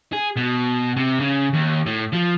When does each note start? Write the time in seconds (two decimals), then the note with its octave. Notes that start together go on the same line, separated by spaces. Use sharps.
0.13 G#4
0.36 B2
0.97 C3
1.20 C#3
1.53 D#2
1.86 A2
2.13 F3